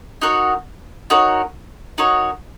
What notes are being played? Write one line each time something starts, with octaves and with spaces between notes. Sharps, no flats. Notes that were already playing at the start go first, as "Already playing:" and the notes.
D#4 F#4 A#4 C#5
D#4 F#4 A#4 C#5
D#4 F#4 A#4 C#5